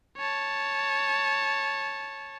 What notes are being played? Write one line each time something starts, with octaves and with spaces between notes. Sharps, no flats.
C#5 A5